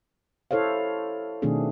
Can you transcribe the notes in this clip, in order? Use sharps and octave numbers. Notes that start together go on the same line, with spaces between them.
E4 A4 C5 C#5 F5
B2 D#3 A3 C4 D4 G#4